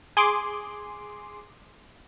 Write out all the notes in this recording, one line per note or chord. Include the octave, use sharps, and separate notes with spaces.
G#4 C6 D6